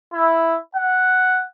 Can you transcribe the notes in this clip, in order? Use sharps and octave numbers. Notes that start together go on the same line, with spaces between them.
E4
F#5